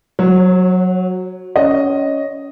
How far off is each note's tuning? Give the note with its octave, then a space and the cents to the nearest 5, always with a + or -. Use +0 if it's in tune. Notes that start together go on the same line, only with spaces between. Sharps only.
F#3 -5 C#5 -40
C#4 +15 D#5 +0